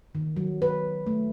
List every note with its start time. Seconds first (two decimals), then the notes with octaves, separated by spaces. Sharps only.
0.15 D#3
0.36 F#3
0.62 B4
1.07 A3